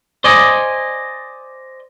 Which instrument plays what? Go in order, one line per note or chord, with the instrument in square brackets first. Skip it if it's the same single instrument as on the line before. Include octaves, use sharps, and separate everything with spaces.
[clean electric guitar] C5 D5 D#5 G#5